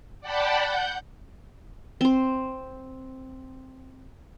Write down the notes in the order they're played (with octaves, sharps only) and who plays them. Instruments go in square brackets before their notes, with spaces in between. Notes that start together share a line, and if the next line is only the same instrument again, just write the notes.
[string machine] D5 F#5 G5 A5 B5
F#5 G6
[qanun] C4 C5